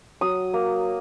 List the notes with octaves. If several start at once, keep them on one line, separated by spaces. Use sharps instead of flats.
F#3 D#6
A#3